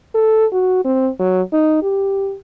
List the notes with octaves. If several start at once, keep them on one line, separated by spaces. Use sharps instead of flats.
A4
F#4
C4
F#3
D#4
G4